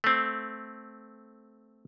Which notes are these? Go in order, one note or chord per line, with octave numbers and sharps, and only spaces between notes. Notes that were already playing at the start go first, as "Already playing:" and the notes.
A3 C4